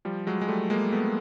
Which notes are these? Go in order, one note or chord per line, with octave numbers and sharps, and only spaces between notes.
F3 G3
F#3 G#3
G#3
G3 A3
G#3 A#3
A3 B3